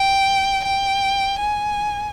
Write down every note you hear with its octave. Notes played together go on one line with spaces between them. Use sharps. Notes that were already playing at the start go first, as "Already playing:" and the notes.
Already playing: G5
G5
G#5